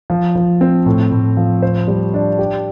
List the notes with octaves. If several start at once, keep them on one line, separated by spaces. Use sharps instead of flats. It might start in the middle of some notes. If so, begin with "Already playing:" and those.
F3
F3
C4
A2
A2
F3
C5
G3
D4
G4